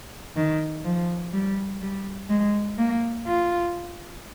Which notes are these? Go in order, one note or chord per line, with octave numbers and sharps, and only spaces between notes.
D#3
F3
G3
G3
G#3
A#3
F4